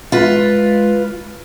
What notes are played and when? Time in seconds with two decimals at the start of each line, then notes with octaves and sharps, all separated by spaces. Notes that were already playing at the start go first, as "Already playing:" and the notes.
0.12 G#3 F4 B4